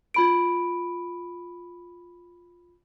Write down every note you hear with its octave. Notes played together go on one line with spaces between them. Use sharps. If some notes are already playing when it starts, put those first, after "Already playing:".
F4 B5 D7